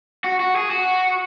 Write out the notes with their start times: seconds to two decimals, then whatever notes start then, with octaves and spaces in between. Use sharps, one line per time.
0.25 F#4
0.40 F#4
0.56 G#4
0.71 F#4